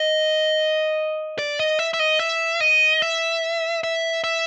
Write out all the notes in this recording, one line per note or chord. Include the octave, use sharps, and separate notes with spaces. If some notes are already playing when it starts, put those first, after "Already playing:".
Already playing: D#5
D5
D#5
E5
E5
D#5
E5
D#5
E5
E5
E5